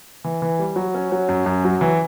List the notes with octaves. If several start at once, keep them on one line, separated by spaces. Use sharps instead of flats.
E3
E3
G3
F#3
C#4
F#3
F#2
F#2
F#3
E3